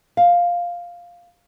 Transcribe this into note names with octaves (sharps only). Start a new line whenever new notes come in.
F5